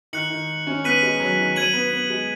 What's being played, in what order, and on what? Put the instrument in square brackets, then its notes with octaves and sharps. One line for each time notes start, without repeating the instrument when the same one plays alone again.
[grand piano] D#3 [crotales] F#6 C#7 F#7
[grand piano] D#3
C#4
[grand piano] B3 [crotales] F#6 B6 D#7 F#7
[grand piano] G#3
F#3
D#3
[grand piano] F#3 [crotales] G#6 D#7 F#7
[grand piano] B3
B3
G#3